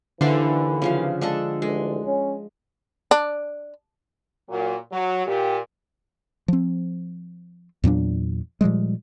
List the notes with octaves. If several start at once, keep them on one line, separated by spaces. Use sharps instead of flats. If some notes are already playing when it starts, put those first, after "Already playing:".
D#2 D3 E3 E4 C5 F5
C#3 F3 F5
G#3 D4 A4
A1 D2 G#3
C#4
D4
A#2 F#3
F#3
A#2 G4
F3 C4
E2 A#2 F#3 D4
A#2 F3 G3 G#3